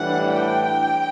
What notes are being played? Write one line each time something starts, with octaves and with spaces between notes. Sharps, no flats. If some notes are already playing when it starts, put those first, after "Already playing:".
Already playing: A2 E3 G3 D4 F#5
G5